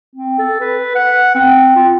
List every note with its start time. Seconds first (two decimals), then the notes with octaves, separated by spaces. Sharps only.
0.15 C4
0.39 A4
0.60 B4
0.95 F#5
1.35 C4
1.75 F4